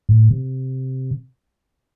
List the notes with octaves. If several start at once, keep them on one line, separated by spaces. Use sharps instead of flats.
A2
C3